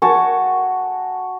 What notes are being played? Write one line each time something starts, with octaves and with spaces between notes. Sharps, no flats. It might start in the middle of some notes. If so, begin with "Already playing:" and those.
F#4 G#5 A5 C#6